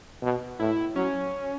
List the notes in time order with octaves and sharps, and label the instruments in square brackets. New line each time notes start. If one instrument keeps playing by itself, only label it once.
[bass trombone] B2
[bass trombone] A2 [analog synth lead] E4
[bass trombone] F#3 [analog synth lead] C#4